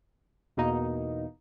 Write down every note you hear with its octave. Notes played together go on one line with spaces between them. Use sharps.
E2 B2 A#3 D#4